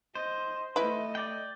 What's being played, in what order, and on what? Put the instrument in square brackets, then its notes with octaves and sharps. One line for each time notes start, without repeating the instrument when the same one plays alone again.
[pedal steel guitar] C5 [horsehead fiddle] D#5
[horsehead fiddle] A3 D#5 [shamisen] E4 B4
[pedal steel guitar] D5 G5